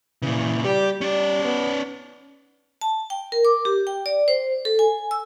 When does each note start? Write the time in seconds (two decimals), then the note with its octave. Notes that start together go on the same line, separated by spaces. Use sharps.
0.22 A#2 C#3 E3
0.64 G3 G4
1.01 G3 C#4 D5
1.44 B3
2.81 A5
3.10 G5
3.32 A#4
3.45 D6
3.65 G4
3.87 G5
4.06 D5
4.28 C5
4.65 A4
4.79 G#5
5.11 E6